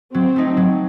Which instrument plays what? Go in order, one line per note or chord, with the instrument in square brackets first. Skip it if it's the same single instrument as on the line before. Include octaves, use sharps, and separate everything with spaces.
[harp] F#3 [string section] C4
[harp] A3 D#4
F#3